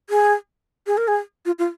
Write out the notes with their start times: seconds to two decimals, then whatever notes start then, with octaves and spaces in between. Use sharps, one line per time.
0.10 G#4
0.87 G#4
0.97 A#4
1.08 G#4
1.46 F4
1.59 F4